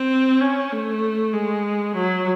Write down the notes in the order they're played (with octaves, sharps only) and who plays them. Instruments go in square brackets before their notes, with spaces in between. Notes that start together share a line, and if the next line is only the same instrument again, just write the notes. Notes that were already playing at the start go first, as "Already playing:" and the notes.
Already playing: [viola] C4
C#4
A3
G#3
F#3